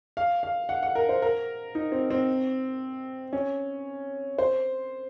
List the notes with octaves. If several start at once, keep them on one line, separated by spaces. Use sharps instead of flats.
F5
F5
F#5
F#5
A#4
C5
A#4
D#4
C4
C4
C#4
C5